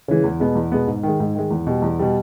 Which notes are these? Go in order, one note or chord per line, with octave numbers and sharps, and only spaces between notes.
C#3 E3 G#3
E2
B2 G#3 B3
E2
B2 G#3 B3
G#2
D#3 G#3
G#2
D#3 G#3
E2
B2 G3
E2
B2 G3